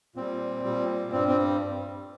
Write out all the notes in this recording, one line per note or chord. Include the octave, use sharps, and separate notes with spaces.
A#2 G3 C4
A#2 G3
G2 G3 C4
C4